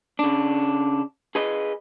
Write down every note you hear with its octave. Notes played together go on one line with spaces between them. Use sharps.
C#3 D4
G#4 B4 D#5